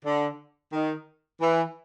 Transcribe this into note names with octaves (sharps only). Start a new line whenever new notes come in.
D3
D#3
E3